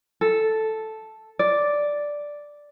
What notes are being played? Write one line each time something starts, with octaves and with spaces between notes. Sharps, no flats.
A4
D5